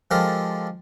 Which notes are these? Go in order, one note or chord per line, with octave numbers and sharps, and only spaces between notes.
F3 G#3 G4 A4 A#4